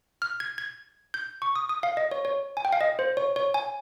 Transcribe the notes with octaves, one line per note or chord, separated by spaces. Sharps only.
F6
G#6
G#6
G6
C#6
D#6
D#6
F5
D#5
C#5
C#5
G#5
G5
F5
D#5
C5
C#5
C#5
G#5